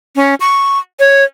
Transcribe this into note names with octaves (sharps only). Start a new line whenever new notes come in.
C#4
C#6
C#5